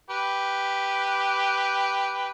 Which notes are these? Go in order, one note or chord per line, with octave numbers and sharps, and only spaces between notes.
G4 B4